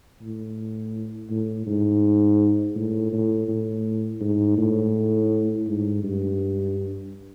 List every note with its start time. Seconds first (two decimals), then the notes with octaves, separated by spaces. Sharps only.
0.21 A2
1.30 A2
1.67 G#2
2.76 A2
3.13 A2
3.48 A2
4.21 G#2
4.58 A2
5.67 G#2
6.03 G2